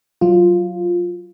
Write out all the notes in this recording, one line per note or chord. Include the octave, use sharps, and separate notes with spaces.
F#3 F4